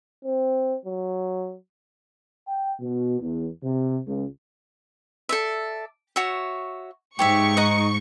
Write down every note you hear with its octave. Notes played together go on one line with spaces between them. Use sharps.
C4
F#3
G5
B2
E2
C3
C#2
A4 D5 E5
F#4 C#5 E5
G#2 G4 C#5 E5 C#6
D#5 F#5 A#5